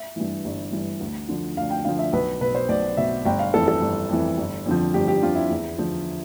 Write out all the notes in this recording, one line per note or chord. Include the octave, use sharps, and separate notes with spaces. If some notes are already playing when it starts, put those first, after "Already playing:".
Already playing: E5
G2 E3
G1
G2 E3
D2
D3 F3
D2 F5
G5
D3 F3 F5
E5
B1 B4
B2 B4
C5
B1 D5
B2 E5
G1 G5
F5
F2 E3 A4
A4
G1
F2 E3
G1
F2 D3 F3
G1 G4
G4
F2 D3 F3 F4
E4
E2
D3 F3